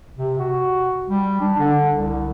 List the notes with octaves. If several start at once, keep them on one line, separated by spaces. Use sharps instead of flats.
C3
F#4
G3
D4
D3
C2